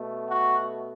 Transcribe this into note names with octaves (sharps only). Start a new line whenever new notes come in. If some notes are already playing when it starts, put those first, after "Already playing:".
Already playing: B2 A3
F#4